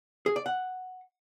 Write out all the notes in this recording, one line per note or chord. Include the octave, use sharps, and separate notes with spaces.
G#4
D5
F#5